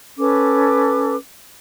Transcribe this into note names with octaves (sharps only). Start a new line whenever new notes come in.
C#4 A4 B4 D6